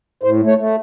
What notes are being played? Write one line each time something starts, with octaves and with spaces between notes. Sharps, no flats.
A2 C5
A3
C#5
A3